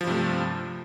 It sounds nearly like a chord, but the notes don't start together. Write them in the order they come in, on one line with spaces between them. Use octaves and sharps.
F3 G2 C3 A3